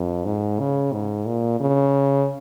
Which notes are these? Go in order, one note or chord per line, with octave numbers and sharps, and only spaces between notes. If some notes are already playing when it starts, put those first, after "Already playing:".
Already playing: F2
G#2
C#3
G#2
A#2
C#3